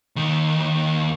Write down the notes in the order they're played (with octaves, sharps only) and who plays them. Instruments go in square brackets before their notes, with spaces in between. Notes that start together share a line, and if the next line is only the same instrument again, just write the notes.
[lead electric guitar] D#2 D#3